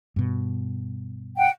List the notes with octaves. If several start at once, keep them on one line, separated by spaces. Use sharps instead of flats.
G2 B2
F#5 G5